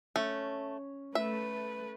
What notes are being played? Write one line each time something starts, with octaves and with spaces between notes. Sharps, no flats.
A3 C#4
A3 B4 E5